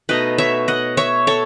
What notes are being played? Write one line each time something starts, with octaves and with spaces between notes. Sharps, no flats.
B2 A3 D#4 B4 D#5
C#5 E5
D#5 F#5
C#5 E5
A4 C#5